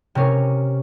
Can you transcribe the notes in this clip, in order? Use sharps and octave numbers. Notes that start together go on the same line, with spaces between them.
C3 C#4 A#4